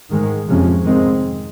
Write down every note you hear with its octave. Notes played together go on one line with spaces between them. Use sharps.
G#2 D#3 G#3
F2 C3 F3 G#3 C#4
G#2 D#3 G#3 C4